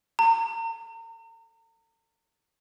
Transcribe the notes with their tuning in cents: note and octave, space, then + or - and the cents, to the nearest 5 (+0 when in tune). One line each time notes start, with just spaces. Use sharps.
A#5 -40